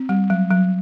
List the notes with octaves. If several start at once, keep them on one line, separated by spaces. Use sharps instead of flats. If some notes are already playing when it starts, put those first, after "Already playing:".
Already playing: C4
G3
F#3
F#3